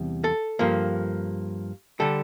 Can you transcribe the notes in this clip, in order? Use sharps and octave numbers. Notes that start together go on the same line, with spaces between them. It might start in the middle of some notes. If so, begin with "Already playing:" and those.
Already playing: E2 C3 G3
A4
G2 F3 A#3
D3 G3 A4